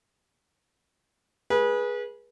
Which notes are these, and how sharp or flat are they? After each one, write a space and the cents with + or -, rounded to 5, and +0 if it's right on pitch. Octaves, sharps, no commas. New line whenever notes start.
G#4 +0 B4 -25